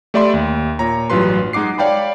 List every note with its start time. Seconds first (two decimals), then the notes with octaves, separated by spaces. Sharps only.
0.14 A3 G4 D5 E5 B5 C6
0.34 D#2
0.79 A#2 C#5 A#5
1.10 A1 G2 F#3 F4 B4 C6
1.53 G#3 D#4 F#5 D6 C7
1.78 C#5 D5 F5 G5 A5 B5